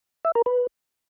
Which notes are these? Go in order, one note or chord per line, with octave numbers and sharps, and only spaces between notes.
E5
A#4
B4